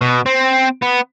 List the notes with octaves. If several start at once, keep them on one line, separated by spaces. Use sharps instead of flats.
B2
C4
B3